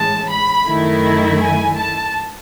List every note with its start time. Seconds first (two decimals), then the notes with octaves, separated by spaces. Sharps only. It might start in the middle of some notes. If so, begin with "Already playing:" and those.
Already playing: A2 E3 G#3 C#4 A5
0.30 B5
0.68 F#2 D#3 A3 E4
1.40 G#5
1.78 A5